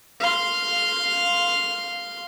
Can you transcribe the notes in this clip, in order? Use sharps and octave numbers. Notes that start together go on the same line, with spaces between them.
F5 C6